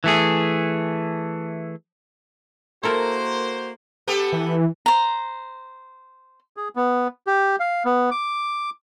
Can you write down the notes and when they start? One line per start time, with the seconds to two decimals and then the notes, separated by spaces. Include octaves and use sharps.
0.04 E3 A3 G#4
2.83 A#3 E4 F#4 A4 A#4 C5
4.07 B3 G4 A4
4.32 E3
4.86 C5 A#5
6.57 G#4
6.76 B3
7.27 G4
7.60 F5
7.85 B3
8.11 D6